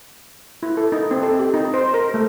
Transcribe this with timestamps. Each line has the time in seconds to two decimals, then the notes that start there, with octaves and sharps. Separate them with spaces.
0.63 E4
0.77 A4
0.92 D#4
1.11 C4
1.23 A4
1.39 G4
1.54 D#4
1.74 C5
1.94 A#4
2.14 A3